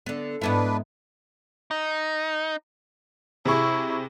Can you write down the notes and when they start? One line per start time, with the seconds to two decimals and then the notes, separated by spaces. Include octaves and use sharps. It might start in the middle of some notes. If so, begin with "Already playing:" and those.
0.06 D3 B3
0.41 G#2 B3 D4 E4 B4
1.71 D#4
3.45 C3 E4 G#4 C#6